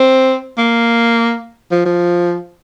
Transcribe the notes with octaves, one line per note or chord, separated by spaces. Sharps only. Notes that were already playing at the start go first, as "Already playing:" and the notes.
Already playing: C4
A#3
F3
F3